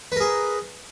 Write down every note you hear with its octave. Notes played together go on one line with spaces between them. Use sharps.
G#4 A#4 B4